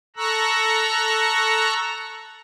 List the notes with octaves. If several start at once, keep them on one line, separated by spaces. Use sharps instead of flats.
A4 A#5 C#6 E6 F#6